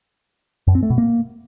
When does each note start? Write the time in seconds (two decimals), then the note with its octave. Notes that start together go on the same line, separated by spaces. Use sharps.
0.67 F#2
0.75 C4
0.83 A3
0.90 B2
0.98 A#3